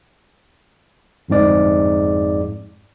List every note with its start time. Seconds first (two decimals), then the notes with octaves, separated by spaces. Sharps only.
1.29 G1 F2 G#2 D5